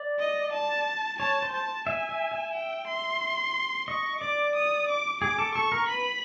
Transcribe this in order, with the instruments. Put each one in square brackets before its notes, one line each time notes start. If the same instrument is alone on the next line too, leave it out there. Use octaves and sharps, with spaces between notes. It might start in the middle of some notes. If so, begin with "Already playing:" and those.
Already playing: [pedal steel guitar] D5
[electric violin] D#5
A5
[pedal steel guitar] C#5 [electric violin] A5
[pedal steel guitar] C5
[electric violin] A5
[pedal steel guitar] E5 [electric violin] G#5
[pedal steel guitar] E5
E5
[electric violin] G5
C6
[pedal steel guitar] D#5 [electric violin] C#6
[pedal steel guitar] D5 [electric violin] D6
[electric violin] D#6
D6
[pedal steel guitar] G#4 [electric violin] D6
[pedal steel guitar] A4
[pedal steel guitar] A4 [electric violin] C#6
[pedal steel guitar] A#4
[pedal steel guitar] B4 [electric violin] B5